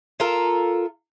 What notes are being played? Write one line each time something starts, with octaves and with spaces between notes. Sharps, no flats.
F4 A4 A#4